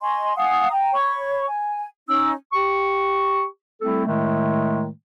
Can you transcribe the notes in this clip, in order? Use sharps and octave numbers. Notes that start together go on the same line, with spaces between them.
D#5 G#5 C6 C#6
F5 F#5 G#5 D#6
G5 A#5
C#5 B5 C#6
G#5
C#4 D#4 E6
G4 C#6
G3 A3 C4 E4 A4
A2 D#3 G#3 A3